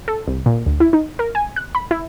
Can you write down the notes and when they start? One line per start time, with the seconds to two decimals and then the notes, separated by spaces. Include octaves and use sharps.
0.08 A4
0.27 C2
0.46 A#2
0.66 D2
0.80 E4
0.93 D#4
1.19 A#4
1.35 G#5
1.56 F#6
1.75 B5
1.91 E4